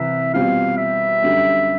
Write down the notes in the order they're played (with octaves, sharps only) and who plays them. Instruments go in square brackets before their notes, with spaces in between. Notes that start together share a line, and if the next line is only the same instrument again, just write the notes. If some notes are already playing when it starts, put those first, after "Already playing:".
Already playing: [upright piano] C2 C3 E3 [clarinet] E5
[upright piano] B2 G3 C4 F4 [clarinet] F5
[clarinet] E5
[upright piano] F#2 D3 G3